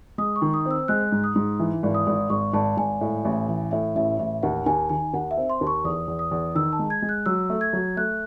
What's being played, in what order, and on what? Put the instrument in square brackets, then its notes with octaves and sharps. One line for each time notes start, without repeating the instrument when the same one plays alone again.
[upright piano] G#3 [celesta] D#6
[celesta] C#6
[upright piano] D#3
[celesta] D#6
[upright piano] C4
[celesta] E6
[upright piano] G#3 [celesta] F#6
[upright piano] G#2
[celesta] D#6
[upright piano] G#2
E3
G#1
[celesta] D#6
[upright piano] G#1
[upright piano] G#1 [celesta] C#6
[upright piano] G#1 [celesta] A5
[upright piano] G#1 [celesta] G#5
[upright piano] A2
A1
E3
[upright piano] A2 [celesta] E5
[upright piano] A1 [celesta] E5
[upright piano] A1 [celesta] E5
[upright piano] D#2 [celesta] F#5
[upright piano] D#2 [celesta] G#5
[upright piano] D#3 [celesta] G#5
[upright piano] D#2 [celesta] F#5
[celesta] E5
[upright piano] C4
[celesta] C6
[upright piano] D#2
[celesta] C#6
[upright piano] E2 [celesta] D#6
[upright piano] E2
[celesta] D#6
[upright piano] E2
[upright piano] D#3 [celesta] E6
[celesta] A5
[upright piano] G#3
[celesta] G#6
[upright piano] G#3
[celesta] F#6
[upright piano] F#3 [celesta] E6
[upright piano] A3
[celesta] G#6
[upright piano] F#3
[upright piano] A3 [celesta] F#6